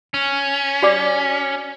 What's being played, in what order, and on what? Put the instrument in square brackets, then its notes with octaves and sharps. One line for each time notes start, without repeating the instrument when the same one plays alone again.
[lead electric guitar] C#4
[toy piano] F#4 D5 D6